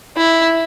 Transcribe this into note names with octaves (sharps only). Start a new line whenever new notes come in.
E4